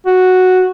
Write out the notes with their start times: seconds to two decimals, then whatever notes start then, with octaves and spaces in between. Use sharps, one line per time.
0.07 F#4